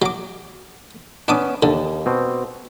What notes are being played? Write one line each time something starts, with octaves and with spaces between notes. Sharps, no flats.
F#3 D6
B3 C#4 D4 D6 D#6
D#2 D3 A5
B2 C4